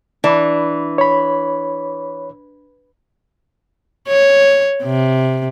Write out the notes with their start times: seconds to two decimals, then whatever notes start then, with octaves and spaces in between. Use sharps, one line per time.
0.24 E3 D4
0.98 C#5 B5
4.08 C#5
4.83 C3